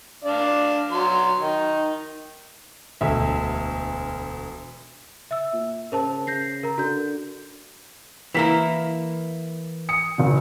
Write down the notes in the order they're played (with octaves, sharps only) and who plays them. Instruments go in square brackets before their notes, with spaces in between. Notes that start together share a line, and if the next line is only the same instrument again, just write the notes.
[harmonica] D4 D5 F5
F#3 C6
D#3 D#4
[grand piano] E1 D2 E5
[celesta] E5 E6
[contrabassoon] A#2
[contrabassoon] C#3 [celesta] A#4 C5 A5
[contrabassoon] C#3 [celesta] G6 A#6 C7
[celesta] A#4 A#5
[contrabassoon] D3 [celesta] F#4 G6
[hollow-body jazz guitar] E3 A#3 E4 [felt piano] B6 E7
[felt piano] D#6 C#7
F#1 D#3